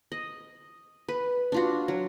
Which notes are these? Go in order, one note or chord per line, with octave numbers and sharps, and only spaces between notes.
D#5
B4
D4 F4 F#4
F#3